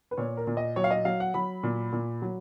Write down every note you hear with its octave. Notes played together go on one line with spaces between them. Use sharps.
B4
A#2 C#5
A#4
A#2
D#5
F#3 C#5
F5
D#5
F#3 F5
F#5
F#3 B5
A#2
A#2
F#3